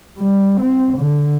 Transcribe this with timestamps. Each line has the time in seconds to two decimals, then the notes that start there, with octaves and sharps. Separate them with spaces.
0.18 G3
0.61 C4
0.98 D3